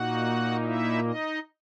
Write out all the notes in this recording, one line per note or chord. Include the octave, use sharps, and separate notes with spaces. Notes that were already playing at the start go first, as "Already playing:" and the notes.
Already playing: A#2 A#3 D#4 F#4 F#5
E4 E5
D#4 D#5